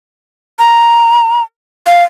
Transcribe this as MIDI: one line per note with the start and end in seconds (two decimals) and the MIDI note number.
0.59 1.43 82
1.86 2.04 77